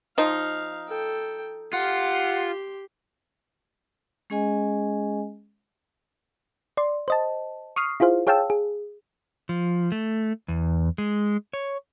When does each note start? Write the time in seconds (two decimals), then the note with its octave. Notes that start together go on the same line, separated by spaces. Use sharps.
0.18 F3 D#4 F5
0.88 A4 G5
1.73 F4 G4 F#5 C6
4.30 G#3 C#4 G#4 D#5 G#5
6.77 D5 C6
7.08 C5 D#5 A5
7.76 C#6 D#6 F6 C7
8.00 E4 F4 G#4 C5 F5
8.27 G#4 C#5 F5 G5 A5 E6
8.50 G#4
9.49 F3
9.92 A3
10.48 E2
10.98 G#3
11.53 C#5